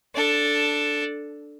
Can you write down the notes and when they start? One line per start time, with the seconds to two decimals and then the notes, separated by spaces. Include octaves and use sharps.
0.15 D4 A4